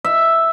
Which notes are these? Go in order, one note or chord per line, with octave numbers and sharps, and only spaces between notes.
E5